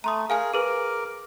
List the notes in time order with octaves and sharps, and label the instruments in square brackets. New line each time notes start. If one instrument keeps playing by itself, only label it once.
[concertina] A3 [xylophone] A#5 C6 D#6
[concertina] G#4 A#4 [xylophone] F5 G#5 F6
[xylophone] G#4 B4 [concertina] A#4 D6